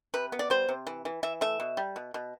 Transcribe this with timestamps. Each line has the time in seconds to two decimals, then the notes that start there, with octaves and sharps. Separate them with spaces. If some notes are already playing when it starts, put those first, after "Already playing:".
0.14 C3 B4
0.32 B3
0.39 D5
0.50 G3 C5
0.69 C3
0.87 E3
1.05 E3
1.23 E3 E5
1.41 A3 E5
1.60 B2
1.77 G3
1.96 B2
2.14 B2